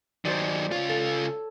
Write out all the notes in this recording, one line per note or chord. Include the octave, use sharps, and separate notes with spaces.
D#3 F#3 C5 D5
C#3 F4 C#5
A4